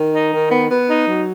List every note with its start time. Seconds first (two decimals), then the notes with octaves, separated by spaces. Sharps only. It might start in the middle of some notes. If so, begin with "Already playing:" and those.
Already playing: D#3
0.12 D#4
0.31 D#3
0.50 B3
0.69 B3
0.88 D#4
1.07 F#3